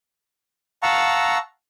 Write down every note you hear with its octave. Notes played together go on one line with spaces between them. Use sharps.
F5 F#5 A5 A#5 C#6 E6